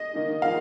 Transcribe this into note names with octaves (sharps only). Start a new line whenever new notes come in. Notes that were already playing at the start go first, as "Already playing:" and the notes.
Already playing: D#5
D#3 A#3 D#4
F3 A#3 F5